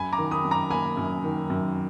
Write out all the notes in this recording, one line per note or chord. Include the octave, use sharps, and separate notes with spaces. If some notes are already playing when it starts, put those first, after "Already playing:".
Already playing: F#2 G#5 B5
A#5 D6
D#3
B5 D#6
F#2
A#5 D6
A#3 G#5 B5
F#2
D#3
F#2